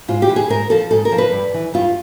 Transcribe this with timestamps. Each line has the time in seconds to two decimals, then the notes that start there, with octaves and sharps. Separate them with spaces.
0.08 G#2 F4
0.22 G4
0.29 E3
0.36 G#4
0.49 G#2 A#4
0.70 F3 A4
0.91 G#2 A4
1.05 A#4
1.12 F3
1.18 B4
1.32 G2
1.54 E3
1.74 G2 F4